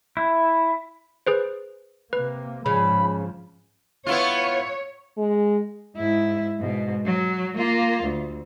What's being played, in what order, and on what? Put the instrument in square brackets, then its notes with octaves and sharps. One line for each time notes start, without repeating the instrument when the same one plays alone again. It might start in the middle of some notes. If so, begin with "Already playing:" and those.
[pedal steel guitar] E4
[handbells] G#4 B4 C5
[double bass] C3 A#3 [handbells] B4
[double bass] G#2 F3 [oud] C#3 C#4 [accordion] B5
[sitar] B3 E4 F4 [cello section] C#5
[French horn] G#3
[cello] G#2 E4
G#2 B2
F#3
A#3 F4
D2